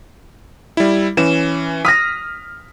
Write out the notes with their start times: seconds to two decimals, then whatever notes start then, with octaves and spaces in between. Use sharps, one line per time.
0.77 G3 E4
1.17 E3 C#4 E7
1.85 D#6 F6 A#6 B6